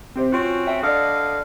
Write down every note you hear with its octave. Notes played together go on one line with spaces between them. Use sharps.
C4 G4 C5
C4 C#4 F4 F#4
E5 G5
D3 A4 D5 D#5 F5